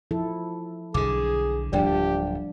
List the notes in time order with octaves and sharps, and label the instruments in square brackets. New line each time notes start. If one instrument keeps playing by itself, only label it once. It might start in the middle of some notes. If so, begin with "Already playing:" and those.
[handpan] F3 E4 A4
[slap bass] B1 D3 [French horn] G#4 [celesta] D6
[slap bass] D1 [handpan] F3 G3 D4 [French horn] G4 [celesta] D5 G5